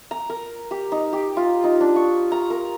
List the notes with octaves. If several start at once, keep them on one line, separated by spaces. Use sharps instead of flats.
A#5
A#4
G4
D#4
G4
F4
D#4
D4
C#6
A#5
A#4